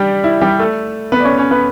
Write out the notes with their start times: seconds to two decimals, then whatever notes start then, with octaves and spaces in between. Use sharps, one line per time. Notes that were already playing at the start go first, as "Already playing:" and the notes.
Already playing: G3 D4 G4
0.24 E4
0.41 G3 G4
0.59 A3 A4
1.12 B3 B4
1.20 D5
1.24 C#4 C#5
1.38 C#4 C#5
1.51 B3 B4